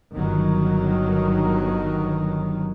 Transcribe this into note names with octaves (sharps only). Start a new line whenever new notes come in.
G1 D#3 F#3